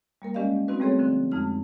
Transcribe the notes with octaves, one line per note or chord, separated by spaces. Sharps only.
G3 A#3 A#4
G#3 C#4 G4 D5 D#5 F5
B3 C4 D#4 F#4 B4
G3 A3 C4 G#4 A4 C#5
D3 F3 C4
F2 G#3 D#4 F6